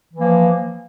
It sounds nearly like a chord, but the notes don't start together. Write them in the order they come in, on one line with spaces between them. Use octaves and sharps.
E3 F3 A#3